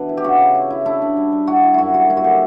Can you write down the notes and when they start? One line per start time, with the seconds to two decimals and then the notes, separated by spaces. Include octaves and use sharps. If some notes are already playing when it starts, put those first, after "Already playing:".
Already playing: B2 E3 D4 B4
0.09 E4
0.17 G4
0.24 C#3 F#4
0.40 C#3
0.55 E4
0.70 E4
0.86 D4 E4
1.02 D4
1.17 G3
1.32 G3
1.47 E4 F#4
1.63 E4
1.74 F#2 E4 F#4
1.94 G3 F#4
2.10 A#3 E4
2.17 F#4
2.24 D3 G4